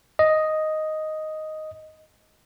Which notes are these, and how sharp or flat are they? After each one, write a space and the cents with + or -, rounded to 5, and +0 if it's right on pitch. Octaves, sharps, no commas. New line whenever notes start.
D#5 +0